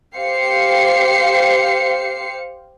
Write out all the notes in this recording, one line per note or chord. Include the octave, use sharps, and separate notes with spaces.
G4 C5 F5 C7 C#7